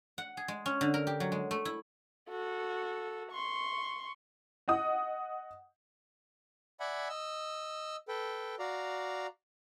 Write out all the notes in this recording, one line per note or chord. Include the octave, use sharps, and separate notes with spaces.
F#5
G#4
G#3
C#4
D3
A#4
G4
F#3
G#3
A3
E4
F#4 A4
C6 C#6
D#5 F#5 D#6
D5 E5 F#5 G#5 B5
D#5 E6
A4 B4 G5
F#4 D5 F5 A#5